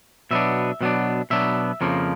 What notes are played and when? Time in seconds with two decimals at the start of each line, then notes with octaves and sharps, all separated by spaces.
0.31 B2 F#3 B3 D4 E5
0.81 B2 F#3 B3 D4
1.30 B2 F#3 B3 D4 E5
1.81 F2 C#3 F3 A#3